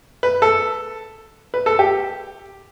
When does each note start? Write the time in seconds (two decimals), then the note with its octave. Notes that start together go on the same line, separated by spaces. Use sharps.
0.23 B4
0.42 A4
1.54 B4
1.66 A4
1.79 G4